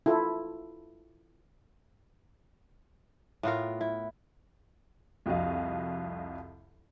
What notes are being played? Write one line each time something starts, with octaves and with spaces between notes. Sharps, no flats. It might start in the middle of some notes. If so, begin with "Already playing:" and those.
E4 F4 A4
A2 B3 F4 A#4
E4
C2 F2 F#4 D#5 F5